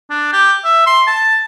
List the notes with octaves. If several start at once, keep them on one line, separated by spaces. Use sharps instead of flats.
D4
G4
E5
C6
A5